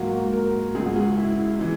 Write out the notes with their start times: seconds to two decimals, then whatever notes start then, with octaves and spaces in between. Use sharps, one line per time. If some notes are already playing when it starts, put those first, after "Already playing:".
Already playing: G#2 F#3 A#3 F#4
0.33 A#4
0.74 C#2 C#3 G#3 G#4
0.85 F#4
0.96 G#4
1.17 E4
1.59 E3 G#3 D#4